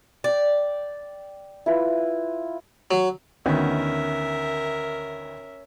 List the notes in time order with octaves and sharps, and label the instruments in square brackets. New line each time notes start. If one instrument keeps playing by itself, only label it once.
[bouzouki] D5 [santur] G5 D6
[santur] E4 F4 B4
[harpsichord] F#3
[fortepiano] D2 D#3 B3 [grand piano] C#4 [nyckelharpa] A#4 E5